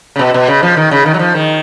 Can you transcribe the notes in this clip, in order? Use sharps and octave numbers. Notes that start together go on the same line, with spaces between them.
C#3
B2
B2
C#3
F3
D#3
C#3
D#3
F#3
F3
D#3